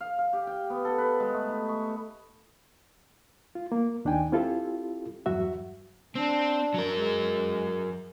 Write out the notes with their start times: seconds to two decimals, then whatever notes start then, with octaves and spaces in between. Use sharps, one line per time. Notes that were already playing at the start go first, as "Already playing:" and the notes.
0.01 F5
0.19 F5
0.33 G4
0.47 G5
0.70 B3
0.85 A4
0.98 B4
1.20 G#3
1.34 A3
1.49 D#4
1.69 C#6
3.55 F4
3.72 A#3
4.05 D#2 D4 D#4 G5 G#5
4.32 C4 E4 F4 G4 A4
5.26 E2 G2 F#3 F#4 E5
6.15 C4 D4
6.74 F#3 A#4
6.95 G#3